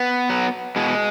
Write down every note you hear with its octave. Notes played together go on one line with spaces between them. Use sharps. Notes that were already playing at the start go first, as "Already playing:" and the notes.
Already playing: B3
F#3
B2 G#3